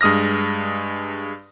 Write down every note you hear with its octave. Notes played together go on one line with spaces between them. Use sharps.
G2 G#3 D#6 F6 A#6